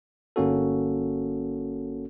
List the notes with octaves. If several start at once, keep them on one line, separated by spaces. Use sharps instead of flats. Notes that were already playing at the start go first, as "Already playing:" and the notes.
G1 A#3 C#4 F#4 A4